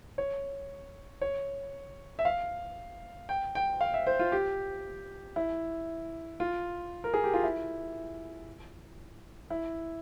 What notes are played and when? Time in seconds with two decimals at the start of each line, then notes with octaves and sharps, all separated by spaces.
0.18 C#5
1.21 C#5
2.19 E5
2.25 F5
3.29 G5
3.55 G5
3.81 F5
3.94 E5
4.07 C5
4.19 F4
4.32 G4
5.36 E4
6.40 F4
7.04 A#4
7.14 G#4
7.24 G4
7.34 F4
7.43 E4
9.50 E4